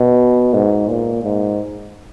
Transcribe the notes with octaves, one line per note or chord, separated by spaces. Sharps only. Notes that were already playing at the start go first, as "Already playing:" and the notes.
Already playing: B2
G#2
A#2
G#2